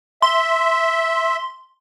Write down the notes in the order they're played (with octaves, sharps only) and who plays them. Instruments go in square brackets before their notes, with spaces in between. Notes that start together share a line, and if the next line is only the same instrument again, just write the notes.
[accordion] E5 [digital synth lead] C6